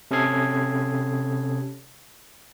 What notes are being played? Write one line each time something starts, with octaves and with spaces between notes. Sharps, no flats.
C3 C#4 A4 D#6 G#6 C7